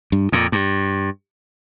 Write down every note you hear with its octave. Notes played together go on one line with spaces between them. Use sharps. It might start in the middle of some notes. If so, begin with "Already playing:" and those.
G2
F2 A#2
G2